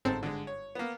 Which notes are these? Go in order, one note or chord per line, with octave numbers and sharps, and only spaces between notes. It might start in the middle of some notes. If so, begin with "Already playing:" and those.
G1 G#2 C4 A4 C5 A5
D3 G#3
C#5
A#3 B3